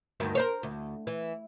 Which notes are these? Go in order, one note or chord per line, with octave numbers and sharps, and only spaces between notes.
D2 G2 D#3
A#4 C5 C#5
D2
E3